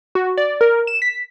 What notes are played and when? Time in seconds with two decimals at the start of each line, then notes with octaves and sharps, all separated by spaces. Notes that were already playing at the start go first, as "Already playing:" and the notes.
0.15 F#4
0.37 D5
0.61 A#4
0.87 E7
1.02 B6